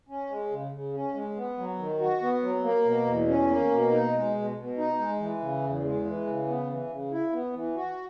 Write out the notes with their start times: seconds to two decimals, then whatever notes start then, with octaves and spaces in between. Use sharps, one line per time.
0.09 C#4
0.30 G#3
0.51 C#3
0.72 C#3
0.93 C#4
1.14 G#3
1.36 B3
1.58 F#3
1.79 D#3
2.00 F#4
2.22 B3
2.42 F#3
2.63 A#3
2.85 B2
3.06 E2
3.28 C#4
3.49 A#3
3.71 B2
3.91 D#4
4.13 G#3
4.34 B2
4.56 B2
4.78 D#4
4.99 G#3
5.19 E3
5.41 C#3
5.63 E2
5.84 G#3
6.05 E3
6.27 C#3
6.47 B3
6.69 E3
6.90 C#3
7.12 E4
7.33 B3
7.53 E3
7.76 F#4